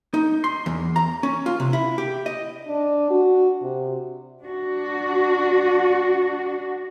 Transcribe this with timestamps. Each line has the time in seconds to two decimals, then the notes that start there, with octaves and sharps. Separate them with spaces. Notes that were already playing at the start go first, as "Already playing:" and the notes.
0.14 D#4
0.44 C6
0.66 E2
0.96 A#5
1.23 C#4
1.46 F4
1.60 C3
1.73 E4
1.98 G4
2.26 D#5
2.68 D4
3.10 F#4
3.62 C3
4.43 D4 F#4